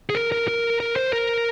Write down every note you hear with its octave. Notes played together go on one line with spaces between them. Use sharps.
G#4
A#4
A#4
A#4
A#4
C5
A#4